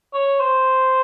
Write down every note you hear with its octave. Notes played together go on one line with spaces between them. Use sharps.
C#5
C5